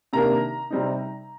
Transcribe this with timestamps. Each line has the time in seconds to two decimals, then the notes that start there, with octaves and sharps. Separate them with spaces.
0.13 C3 D#3 A#3 D4 A#5
0.70 C3 G3 C4 D#4